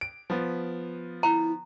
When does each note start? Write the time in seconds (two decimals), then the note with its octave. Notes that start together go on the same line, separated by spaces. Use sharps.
0.01 D7
0.30 F3 B3
1.23 E4 A#5